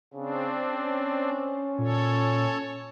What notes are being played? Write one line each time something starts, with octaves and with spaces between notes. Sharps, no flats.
C#3 C4 D4
C#4
A#2 A4 C#5